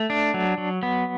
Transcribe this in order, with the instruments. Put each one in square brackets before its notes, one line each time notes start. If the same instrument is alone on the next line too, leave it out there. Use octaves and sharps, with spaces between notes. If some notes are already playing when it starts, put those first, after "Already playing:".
Already playing: [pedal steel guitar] A3
D4
F#3
F#3
B3